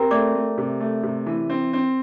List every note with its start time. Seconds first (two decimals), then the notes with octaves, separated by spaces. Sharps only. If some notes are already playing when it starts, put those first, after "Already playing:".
Already playing: C4 G4 A#4 G5 A#5
0.11 A3 D5 D6
0.35 A3
0.58 C3
0.80 A3
1.03 C3
1.26 E3
1.50 C4
1.73 C4